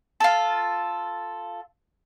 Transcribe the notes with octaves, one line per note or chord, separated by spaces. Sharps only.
F4 A4